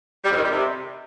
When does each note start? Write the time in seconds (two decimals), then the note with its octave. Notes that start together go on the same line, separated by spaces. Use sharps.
0.24 G3
0.31 F2
0.37 D#3
0.44 G3
0.50 C3